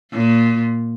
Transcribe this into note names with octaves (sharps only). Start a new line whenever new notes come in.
A#2